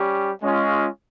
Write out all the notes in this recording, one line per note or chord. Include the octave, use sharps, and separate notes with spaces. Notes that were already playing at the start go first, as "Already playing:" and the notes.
Already playing: G3 C#4 G4
G#3 C#4 F4